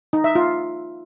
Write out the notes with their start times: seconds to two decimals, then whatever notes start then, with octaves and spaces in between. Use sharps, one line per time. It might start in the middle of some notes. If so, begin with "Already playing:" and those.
0.13 D#4
0.24 E5
0.35 F4